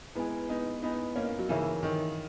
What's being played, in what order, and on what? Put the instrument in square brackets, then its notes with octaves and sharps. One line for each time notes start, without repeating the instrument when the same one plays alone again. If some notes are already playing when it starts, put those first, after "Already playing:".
[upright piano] G#3 B3 [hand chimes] E4 B4 D#5 G#5
[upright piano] B3 D#4
[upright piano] B3 D#4 [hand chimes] E4 B4 D#5 G#5
[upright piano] A#3 C#4
F#3
[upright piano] C#3 E3 [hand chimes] D#4 A#4 C#5 E5
[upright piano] D#3